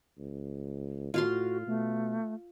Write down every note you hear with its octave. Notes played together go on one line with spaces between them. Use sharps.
C#2
A2 F4 F#4 F5 C6
B2 A3